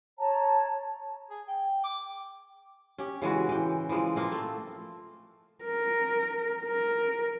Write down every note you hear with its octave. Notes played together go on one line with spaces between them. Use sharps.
C#5 A5 A#5
G#4
G5
D6
C#4 G4
C#3 E3 G#3 F#4
E3 G5
E3 F3 G#3
F3 A#3 C4
A3
A#4
A#4